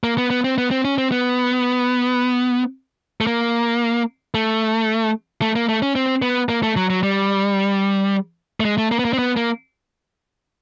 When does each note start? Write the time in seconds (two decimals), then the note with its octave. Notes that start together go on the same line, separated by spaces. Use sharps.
0.04 A#3
0.18 B3
0.30 B3
0.44 C4
0.58 B3
0.71 C4
0.85 C#4
0.98 C4
1.12 B3
3.21 A3
3.27 A#3
4.34 A3
5.42 A3
5.55 A#3
5.69 A3
5.82 C#4
5.95 C4
6.22 B3
6.49 A#3
6.63 A3
6.76 F#3
6.90 F#3
7.03 G3
8.60 A3
8.65 G#3
8.78 A3
8.91 A#3
8.99 B3
9.05 A#3
9.13 C4
9.19 B3
9.37 A#3